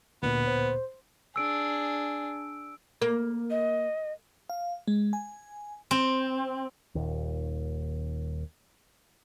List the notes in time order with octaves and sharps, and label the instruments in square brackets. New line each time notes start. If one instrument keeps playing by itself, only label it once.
[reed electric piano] D2 A#2 [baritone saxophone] B3
[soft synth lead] C5
[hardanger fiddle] D4 G#4 [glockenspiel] E6 D7
[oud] A#3
[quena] D#5
[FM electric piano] F5
G#3
G#5
[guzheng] C4
[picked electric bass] D#1 D#2